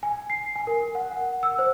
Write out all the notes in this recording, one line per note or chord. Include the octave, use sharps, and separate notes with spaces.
G#5
C7
G#5
A#4
F#5
F#5
E6
C5